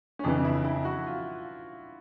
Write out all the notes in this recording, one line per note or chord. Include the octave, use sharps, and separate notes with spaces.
C#4
F2 C#3 E3 D4
E4
E4
F#4
F4